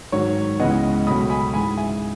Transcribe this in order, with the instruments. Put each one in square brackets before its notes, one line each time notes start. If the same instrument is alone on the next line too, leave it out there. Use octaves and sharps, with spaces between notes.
[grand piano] G#2 D#3 F#3 C#5
C#2 C#3 E3 G#3 B3 D#5 F#5
C#2 B2 F#3 A3 C#4 B5 D#6
G#5 B5
G#2 E3 G#3 G#5 B5
E5 G#5